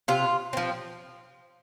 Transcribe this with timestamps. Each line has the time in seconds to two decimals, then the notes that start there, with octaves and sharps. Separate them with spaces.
0.08 C3 F4
0.53 F3 C4